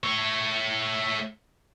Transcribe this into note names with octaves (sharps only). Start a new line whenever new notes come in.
A3 C#5